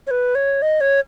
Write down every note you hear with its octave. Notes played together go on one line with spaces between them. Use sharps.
C#5
B4
C#5
D#5
C#5